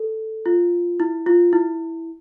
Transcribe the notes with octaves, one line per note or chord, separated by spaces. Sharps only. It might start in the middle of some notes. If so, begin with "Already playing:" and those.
Already playing: A4
F4
E4
F4
E4